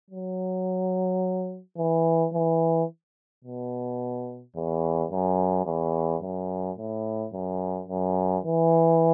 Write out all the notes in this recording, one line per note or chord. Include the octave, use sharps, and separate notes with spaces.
F#3
E3
E3
B2
E2
F#2
E2
F#2
A2
F#2
F#2
E3